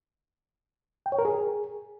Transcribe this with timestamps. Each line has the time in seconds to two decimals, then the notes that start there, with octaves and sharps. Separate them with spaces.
1.06 G5
1.12 C#5
1.19 A#4
1.25 G#4